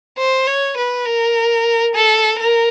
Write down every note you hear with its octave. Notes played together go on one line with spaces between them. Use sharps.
C5
C#5
B4
A#4
A4
A#4